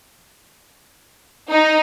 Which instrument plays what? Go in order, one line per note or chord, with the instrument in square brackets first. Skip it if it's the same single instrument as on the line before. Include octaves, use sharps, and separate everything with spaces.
[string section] D#4